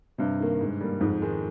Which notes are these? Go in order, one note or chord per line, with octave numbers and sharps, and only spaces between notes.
G2 C3
D#3 A#3
G#2
G3 A#3
F2 G#2
D#3 G#3